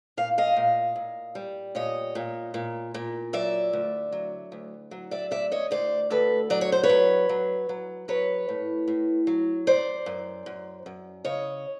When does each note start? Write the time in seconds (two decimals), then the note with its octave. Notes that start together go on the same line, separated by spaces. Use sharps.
0.17 A#2 F5
0.38 D#5 F5
0.57 A#2
0.96 A#2
1.35 G3
1.75 A#2 C#5 D#5
2.15 A#2
2.54 A#2
2.94 A#2
3.33 F#3 D5 E5
3.73 D2
4.12 F#3
4.52 D2
4.91 F#3
5.11 D5 E5
5.31 D2 D5 E5
5.52 C#5 D#5
5.71 D2 C5 D5
6.10 D2 A4 B4
6.50 F#3 D5
6.61 C#5
6.72 C5
6.83 B4 C#5
6.89 F#3
7.29 F#3
7.69 F#3
8.08 F#3 B4 C#5
8.49 A2
8.88 A2
9.27 F#3
9.67 F#2 C5 D5
10.06 F#2
10.46 F#2
10.86 F#2
11.25 C#3 C#5 D#5